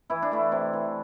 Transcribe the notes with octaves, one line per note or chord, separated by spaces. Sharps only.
E3 E4
D4
A3 E4
C3
E3